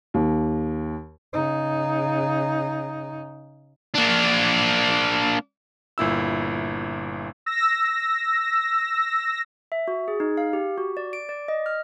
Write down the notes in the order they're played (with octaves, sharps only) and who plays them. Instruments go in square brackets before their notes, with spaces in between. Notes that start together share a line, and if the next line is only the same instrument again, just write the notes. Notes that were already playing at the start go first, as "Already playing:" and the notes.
[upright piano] D#2
[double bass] C#3 D#4
[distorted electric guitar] A#3 D4
[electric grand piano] G1 A#2 E4 E6
[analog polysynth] E6 A#6
[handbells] E5
F#4
G#4
D#4
F5
G4
F#4
D5
D7
D5
D#5
F6